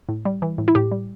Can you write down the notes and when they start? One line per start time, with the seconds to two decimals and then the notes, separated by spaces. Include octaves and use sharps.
0.09 A2
0.25 G3
0.42 E3
0.58 A2
0.68 E4
0.75 A2 G4
0.91 G3